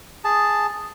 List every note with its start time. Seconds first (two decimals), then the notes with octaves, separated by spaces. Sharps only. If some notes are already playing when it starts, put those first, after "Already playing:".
0.24 G#4 A5